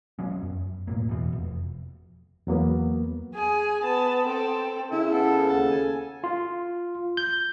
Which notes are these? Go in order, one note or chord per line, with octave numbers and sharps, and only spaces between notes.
F#3 B3 C#4
F#2
B1 A2 A#3
E2 B2
F1
E2 F#3 A#3 B3
G#4 G#5
B3 A5
C4 A4
C#3 E4
B3 A4
D#2 A4
G#5
F4
G6